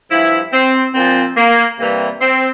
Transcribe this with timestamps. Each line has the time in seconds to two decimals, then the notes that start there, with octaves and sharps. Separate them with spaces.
0.11 G2 F3 E4
0.53 C4
0.94 A#2 F3 C4
1.37 A#3
1.80 C3 E3 G3 A#3
2.21 C4